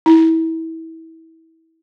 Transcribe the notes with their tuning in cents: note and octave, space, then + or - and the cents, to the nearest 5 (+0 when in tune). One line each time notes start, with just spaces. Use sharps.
E4 -25